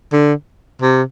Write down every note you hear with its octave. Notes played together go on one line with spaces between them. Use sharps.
D3
C3